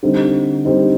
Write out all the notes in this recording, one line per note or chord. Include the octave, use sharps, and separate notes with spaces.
D3 G3 C4 D#4
D3 G3 C4 D#4